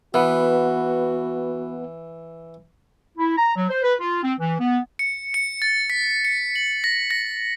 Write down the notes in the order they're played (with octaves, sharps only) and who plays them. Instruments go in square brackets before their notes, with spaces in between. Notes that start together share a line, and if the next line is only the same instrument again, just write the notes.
[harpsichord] E3 [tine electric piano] B3 B4 F#5 [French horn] F#4
[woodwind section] E4
A#5
F#3
C5
B4
F4
C4
E3
B3
[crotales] C#7
C#7
A6
B6
C#7
F#7
A#6
A#6